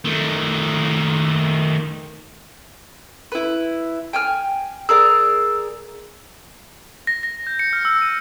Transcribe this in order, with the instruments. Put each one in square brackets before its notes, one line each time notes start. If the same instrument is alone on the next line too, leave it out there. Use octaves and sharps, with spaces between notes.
[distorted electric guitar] D#3 A3
[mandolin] E4 B4
G5 G#5 F6
[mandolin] G#4 A#4 D5 [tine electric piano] E6
[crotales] A#6
A#6
G6
C#7
F6
E6
D#7